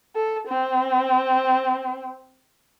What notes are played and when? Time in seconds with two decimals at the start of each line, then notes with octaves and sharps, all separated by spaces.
0.16 A4
0.48 C4